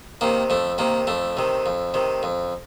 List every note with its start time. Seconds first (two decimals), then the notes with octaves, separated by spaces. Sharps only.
0.21 C3 D#3 A#3
0.50 F2 A3
0.78 C3 D#3 A#3
1.07 F2 A3
1.37 C3 D#3
1.66 F2
1.94 C3 D#3
2.23 F2